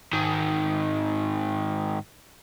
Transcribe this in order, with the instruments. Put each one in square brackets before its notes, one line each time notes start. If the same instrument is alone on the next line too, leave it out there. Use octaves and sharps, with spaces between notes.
[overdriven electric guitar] G#2 D#3